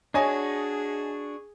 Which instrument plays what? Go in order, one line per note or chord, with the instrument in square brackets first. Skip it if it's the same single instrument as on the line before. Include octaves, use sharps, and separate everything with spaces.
[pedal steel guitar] D4 F#4 [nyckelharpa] G#4 [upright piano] C#5 D#5 G#5